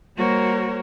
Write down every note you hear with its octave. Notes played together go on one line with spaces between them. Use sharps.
G3 A#3 F#4 A#4 C5 C#5